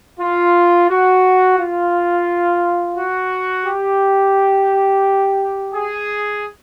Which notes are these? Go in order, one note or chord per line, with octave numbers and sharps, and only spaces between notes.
F4
F#4
F4
F#4
G4
G#4